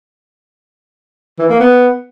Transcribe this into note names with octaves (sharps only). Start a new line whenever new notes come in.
E3
A#3
B3